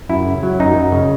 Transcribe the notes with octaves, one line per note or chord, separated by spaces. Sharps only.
F#2 E4
C#3
F#3
F#2 D#4
F#2
C#3